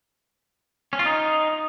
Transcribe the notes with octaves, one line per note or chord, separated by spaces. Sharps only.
C#4
F4
D#4